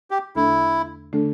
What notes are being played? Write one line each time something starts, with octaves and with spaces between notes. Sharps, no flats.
G4
E2 D3 A3 D4 E4 A4
D3 A3 D4 A4